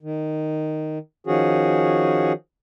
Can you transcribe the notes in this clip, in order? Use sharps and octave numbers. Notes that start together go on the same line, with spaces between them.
D#3
D#3 F3 C#4 F#4 G#4